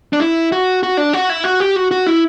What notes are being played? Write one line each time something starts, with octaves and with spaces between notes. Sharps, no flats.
D4
E4
F#4
F#4
D4
F#4
E4
F#4
G4
F#4
F#4
E4